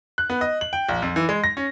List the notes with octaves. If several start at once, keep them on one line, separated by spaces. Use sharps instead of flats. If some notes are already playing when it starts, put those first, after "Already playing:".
F#6
B3
D#5
F#7
G5
A#1
F2
E3
G#3
A#6
C#4